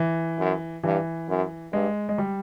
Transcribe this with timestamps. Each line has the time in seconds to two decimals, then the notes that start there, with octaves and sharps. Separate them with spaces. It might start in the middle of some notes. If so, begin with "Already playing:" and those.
Already playing: E3
0.39 F#2
0.83 G2 E3
1.29 F#2
1.73 G2 G#3
2.09 G#3
2.18 G3